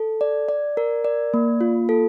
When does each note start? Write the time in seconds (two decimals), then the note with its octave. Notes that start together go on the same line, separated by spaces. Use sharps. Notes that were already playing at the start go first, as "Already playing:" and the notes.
Already playing: A4
0.21 D5
0.49 D5
0.77 A#4
1.05 D5
1.34 A#3
1.61 F4
1.89 A4